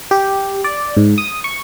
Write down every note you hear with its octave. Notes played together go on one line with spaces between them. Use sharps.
G4
D5
G#2
D#6
C#6